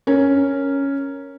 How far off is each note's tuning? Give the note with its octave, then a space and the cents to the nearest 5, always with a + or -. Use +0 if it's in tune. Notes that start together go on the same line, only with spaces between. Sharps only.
C#4 +0 A#4 +0